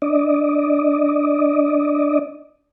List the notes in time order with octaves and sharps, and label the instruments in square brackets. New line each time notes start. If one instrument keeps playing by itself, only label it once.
[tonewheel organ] D4 D5 D#5